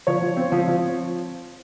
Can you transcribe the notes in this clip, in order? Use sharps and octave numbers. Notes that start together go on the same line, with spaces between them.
F3 C#5
F3
C4
F3
F3